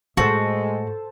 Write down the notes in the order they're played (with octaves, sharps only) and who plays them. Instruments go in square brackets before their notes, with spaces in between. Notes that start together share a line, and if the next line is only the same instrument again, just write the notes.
[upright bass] A2 [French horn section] G#3 [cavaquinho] F#4 [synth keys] A4 C5 A5